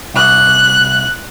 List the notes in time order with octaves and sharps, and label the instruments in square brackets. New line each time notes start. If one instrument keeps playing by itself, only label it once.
[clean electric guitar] C2 [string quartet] F#6